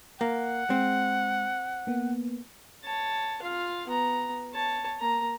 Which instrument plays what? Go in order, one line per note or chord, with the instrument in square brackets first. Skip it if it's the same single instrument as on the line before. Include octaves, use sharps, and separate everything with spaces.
[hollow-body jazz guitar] A#3 [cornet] F#5
[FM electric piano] G#3 [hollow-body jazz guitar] C4
[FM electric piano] A#3 B3
[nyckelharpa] C#5 A5
F4 F5
B3 A#5
C#5 A5
A#3 A#5